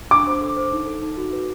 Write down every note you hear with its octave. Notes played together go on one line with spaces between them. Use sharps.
D4 D6
C5
A4
C5
D#4
A4
D#4
F#4
B4